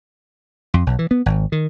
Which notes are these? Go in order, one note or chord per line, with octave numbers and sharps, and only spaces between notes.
F2
B1
E3
B3
G#1
D#3